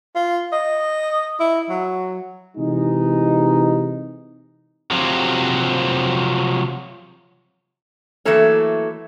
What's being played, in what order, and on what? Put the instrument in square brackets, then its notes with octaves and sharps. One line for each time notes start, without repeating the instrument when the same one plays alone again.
[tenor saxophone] F4
D#5
E4
F#3
[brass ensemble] C3 E3 G#3 D#4
[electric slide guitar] C3 F3 F#3 C4
[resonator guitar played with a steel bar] E3 F#3 A3 A#3 A4 C#5